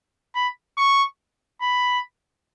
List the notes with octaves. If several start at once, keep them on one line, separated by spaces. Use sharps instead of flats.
B5
C#6
B5